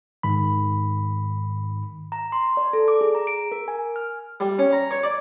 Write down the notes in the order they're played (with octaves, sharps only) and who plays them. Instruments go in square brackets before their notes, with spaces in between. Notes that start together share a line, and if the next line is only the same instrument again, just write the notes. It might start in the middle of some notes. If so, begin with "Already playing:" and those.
[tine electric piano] G#2 D#3 B5
[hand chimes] A#5
C6
D5
A4
D6
G#4
A#5
D7
A#4
G#5
F6
[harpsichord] G3
C#4
A#5
C#5
D5